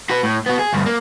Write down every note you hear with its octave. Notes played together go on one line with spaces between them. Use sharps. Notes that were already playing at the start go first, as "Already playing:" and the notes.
F#4 B4
A2
B3 F#4
G#4
D2 G2
A#3